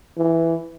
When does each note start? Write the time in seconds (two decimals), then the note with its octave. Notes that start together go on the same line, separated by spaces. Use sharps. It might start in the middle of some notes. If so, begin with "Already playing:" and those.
0.17 E3